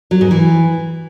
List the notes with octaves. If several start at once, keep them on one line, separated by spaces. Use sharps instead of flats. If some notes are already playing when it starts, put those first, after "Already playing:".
F#3
G#2
E3